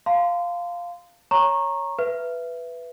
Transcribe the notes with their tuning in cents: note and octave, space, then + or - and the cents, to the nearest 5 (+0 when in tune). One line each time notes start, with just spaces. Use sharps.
F5 +0 A5 +45 C6 -25
C#5 +0 A#5 +0 C#6 -20
B4 +0 E5 +20